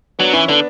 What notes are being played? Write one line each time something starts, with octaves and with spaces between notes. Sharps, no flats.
F#3 B3 D4
E3 C#4 E4
D3 B3 D4